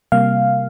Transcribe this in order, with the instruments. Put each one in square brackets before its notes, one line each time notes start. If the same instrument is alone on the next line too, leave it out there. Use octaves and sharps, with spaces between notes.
[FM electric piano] C3 G3 A#3 F5